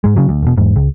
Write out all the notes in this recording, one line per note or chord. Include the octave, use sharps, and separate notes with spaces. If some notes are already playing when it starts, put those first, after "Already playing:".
G#2 G#3
C#3 F#3
D2
E1 B2
E2 G#2
C#2